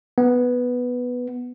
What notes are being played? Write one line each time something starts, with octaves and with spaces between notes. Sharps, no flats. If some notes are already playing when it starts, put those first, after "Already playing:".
B3